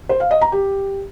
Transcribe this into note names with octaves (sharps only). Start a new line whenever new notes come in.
C5
F5
D#5
A#5
G4